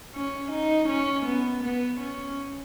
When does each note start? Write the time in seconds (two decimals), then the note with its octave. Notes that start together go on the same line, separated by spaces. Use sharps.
0.15 C#4
0.52 D#4
0.89 C#4
1.27 B3
1.64 B3
2.01 C#4